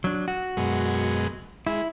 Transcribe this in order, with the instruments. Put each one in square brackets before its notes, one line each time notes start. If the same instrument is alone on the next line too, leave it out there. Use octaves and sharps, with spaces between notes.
[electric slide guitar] F#3 D4
F#4
[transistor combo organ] F#2 B2 G#3
[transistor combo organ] G#3 [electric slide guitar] E4